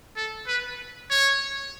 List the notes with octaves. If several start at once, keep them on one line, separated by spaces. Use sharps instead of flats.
A4
B4
C#5